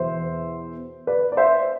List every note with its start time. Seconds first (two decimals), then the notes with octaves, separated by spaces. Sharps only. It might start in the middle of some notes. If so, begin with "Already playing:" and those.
Already playing: E2 B2 C5 E5
1.07 B4 D5
1.32 D5
1.37 C5 E5